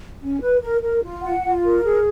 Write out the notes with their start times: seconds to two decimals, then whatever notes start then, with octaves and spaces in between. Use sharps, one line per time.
0.21 C#4
0.41 B4
0.62 A#4
0.82 A#4
1.03 F4
1.23 F#5
1.44 F4
1.65 A#4
1.84 G#4